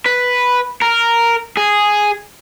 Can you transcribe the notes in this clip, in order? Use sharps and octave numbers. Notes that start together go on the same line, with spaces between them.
B4
A#4
G#4